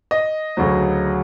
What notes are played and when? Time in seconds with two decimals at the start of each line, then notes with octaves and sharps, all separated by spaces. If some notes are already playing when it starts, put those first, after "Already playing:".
0.11 D#5
0.57 D2 C#3 F#3